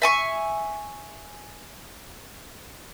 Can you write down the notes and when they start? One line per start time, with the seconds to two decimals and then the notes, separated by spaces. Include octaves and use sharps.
0.02 E5 G#5 C#6